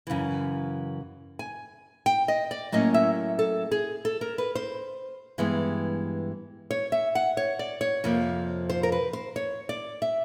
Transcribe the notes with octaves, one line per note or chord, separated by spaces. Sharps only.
F#2 C#3 E3
G#5
G5
D#5
D5
A2 F#3 A#3 C#4 D#5
E5
A4
G#4
A4
A#4
B4
C5
G2 E3 G#3 B3
C#5
E5
F#5
C#5
D5
C#5
F2 C3 F3 A#3
C5
A#4
B4
C5
C#5
D5
E5